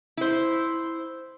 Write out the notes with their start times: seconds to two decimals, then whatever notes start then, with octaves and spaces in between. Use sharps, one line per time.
0.17 E4 C5